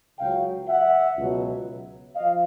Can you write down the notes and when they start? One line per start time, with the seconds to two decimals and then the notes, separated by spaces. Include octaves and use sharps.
0.19 C#2 C#3 F#3 F5 G5
0.68 E5 F#5
1.17 C#2 B2 F#3
2.16 F3 D#5 F5